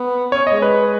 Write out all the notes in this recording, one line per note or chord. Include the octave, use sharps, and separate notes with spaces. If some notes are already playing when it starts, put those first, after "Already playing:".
Already playing: B3
C#4 C#5
D#5
G#3
B4